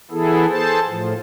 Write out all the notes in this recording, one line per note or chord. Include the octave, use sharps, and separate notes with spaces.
E3 B3 E4 G#4 A4
G#4 A4 C5 A5
A2 F3